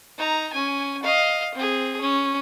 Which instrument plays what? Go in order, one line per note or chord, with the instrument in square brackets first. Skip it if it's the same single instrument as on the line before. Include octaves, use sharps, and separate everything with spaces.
[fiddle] D#4 A#5
C#4 G#5
D#5 F5
C4 G#4
C#4